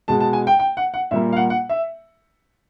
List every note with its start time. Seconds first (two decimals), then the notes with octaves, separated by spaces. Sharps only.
0.08 B2 G#3 A5
0.21 A5
0.33 G#5
0.47 G5
0.59 G5
0.77 F#5
0.94 F#5
1.11 A#2 G3 A#3 E5
1.32 F5
1.37 F#5
1.50 F#5
1.69 E5